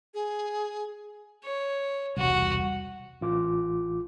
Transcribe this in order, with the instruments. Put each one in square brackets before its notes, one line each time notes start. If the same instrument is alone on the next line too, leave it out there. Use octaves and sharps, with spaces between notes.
[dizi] G#4
[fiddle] C#5
[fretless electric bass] E1 C2 [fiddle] F#4
[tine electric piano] A1 F4 D6